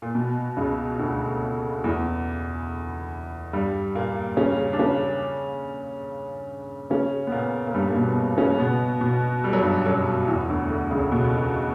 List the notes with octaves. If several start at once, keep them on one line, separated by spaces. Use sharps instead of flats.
A#2
B2
C#2 C#3
D2 D3
E2 E3
G2 G3
A#2 A#3
C#3 C#4
D4
C#3 C#4
C#3 C#4
B3
A#2 A#3
A#3
G2 G3
A#3
B2 B3
C#3 C#4
B2 B3
B2 B3
G3
F#3
G2 G3
F#2 F#3
E2 E3
D2 D3
D2 D3
C#2 C#3
B2